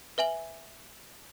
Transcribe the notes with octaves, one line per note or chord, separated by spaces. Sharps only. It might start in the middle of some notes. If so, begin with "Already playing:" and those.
B4 E5 G#5 F#7